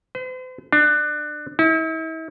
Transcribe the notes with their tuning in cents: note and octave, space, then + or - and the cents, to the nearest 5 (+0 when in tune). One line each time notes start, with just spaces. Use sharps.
C5 -45
D4 +25
E4 -40